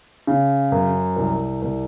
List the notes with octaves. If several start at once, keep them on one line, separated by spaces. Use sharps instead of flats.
C#3
F#2
C2
C2